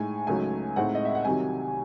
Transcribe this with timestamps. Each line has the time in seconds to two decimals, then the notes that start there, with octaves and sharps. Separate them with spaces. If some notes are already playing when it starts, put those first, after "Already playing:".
Already playing: A2 G#3 D#4 G#5
0.27 C#2 C#3 F#3 A3 D#4 G#5
0.76 A2 G#3 C4 D#4 F#5
0.95 D#5
1.05 E5
1.15 F#5
1.25 C2 C3 D#3 F#3 G#5